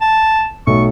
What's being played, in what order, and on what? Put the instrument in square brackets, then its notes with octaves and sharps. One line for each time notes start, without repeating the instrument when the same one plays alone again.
[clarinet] A5
[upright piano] B1 A3 [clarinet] C#6